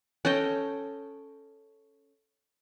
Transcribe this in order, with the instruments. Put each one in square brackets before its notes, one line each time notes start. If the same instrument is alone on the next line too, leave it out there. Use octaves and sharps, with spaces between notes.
[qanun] C#4 A4 D#5 G5